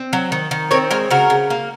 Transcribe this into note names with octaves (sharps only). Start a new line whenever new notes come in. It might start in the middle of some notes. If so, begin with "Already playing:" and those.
Already playing: C4
F#3
D#3
D#3
C4 A#4 C#5
G#3 A#4 C#5
C#3 F#4 A#4
C#3
A#3